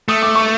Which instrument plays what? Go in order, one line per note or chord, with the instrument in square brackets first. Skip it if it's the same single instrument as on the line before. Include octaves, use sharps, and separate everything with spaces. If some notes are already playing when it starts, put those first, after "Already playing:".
[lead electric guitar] A3 [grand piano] D#6
[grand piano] D6
C#6